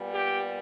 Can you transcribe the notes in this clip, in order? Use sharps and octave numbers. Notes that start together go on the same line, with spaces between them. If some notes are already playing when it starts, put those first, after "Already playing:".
Already playing: A#2 G3 B3
G4